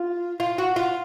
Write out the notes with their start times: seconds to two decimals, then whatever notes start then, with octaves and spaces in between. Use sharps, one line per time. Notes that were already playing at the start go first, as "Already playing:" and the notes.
Already playing: F4
0.40 F4
0.58 F#4
0.76 F4